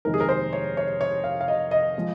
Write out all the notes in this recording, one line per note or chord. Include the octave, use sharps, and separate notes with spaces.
F1 D#2 D#3 G#3 A#4
G#4
A#4
C5
C#5
C#5
C#5
F5
F5
D#5
D#5
F3 G#3